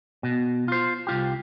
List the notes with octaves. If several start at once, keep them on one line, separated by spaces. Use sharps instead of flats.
B2
F4 C5
C2 F4 G4